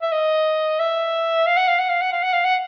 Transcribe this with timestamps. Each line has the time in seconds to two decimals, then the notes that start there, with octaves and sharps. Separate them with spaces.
0.02 E5
0.11 D#5
0.79 E5
1.46 F5
1.57 F#5
1.68 F5
1.79 F#5
1.89 F5
2.01 F#5
2.12 F5
2.23 F#5
2.33 F5
2.44 F#5